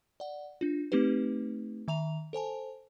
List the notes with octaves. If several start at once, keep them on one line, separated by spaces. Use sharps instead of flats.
D5 F#5
D4 F4
A3 C4 D#4 G4 B4
D#3 E5 A#5 F7
A4 C5 G#5 A5